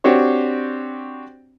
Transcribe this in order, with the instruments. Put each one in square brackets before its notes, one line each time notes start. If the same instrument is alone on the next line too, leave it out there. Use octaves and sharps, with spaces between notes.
[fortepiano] C4 D4 F#4 G4 C#5